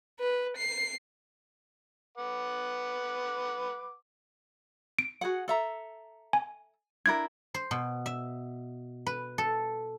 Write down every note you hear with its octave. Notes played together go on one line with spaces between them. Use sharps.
B4
C7
B4 F#5 D6
D7
F#4 G#4 F#5
A4 E5 A#5
G#5
D4 E4 A#4 G#6
C5
B2
E5
B4
A4